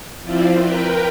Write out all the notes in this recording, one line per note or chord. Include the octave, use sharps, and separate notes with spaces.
F3 C4 E4 F4 C5 D5
A#4 B4 G5